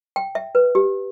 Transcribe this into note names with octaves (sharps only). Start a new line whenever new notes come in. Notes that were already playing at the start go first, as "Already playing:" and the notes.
G5
E5
B4
G4